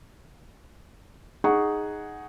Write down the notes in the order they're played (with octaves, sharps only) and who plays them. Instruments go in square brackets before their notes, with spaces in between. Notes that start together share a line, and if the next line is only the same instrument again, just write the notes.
[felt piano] D#4 G#4 F#5 C#6